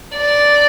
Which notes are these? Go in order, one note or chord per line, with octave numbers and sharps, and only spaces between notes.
D5